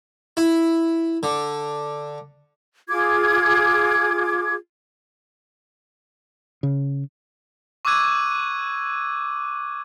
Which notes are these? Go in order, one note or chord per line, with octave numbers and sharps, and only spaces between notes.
E4
D3
F4 G#4 D6 G#6
C#3
C#6 D6 E6 F#6 G#6 D#7